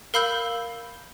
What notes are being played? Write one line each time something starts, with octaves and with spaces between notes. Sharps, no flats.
A#4 F5 B5 E6 G6 G7